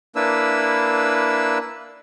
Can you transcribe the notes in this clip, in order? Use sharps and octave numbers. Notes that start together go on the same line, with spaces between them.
A#3 D4 E4 B4 E6